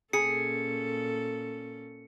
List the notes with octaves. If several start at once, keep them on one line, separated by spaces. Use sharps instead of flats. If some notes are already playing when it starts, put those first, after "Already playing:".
A#2 C#4 G#4 A4 C#7